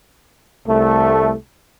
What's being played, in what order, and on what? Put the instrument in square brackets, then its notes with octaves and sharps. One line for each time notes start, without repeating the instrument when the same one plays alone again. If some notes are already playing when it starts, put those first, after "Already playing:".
[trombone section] C2 A3